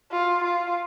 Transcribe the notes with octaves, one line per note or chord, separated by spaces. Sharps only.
F4
F4